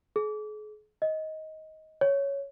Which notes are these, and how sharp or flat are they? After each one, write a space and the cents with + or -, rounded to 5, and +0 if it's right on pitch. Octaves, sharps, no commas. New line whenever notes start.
G#4 +40
D#5 +15
C#5 +5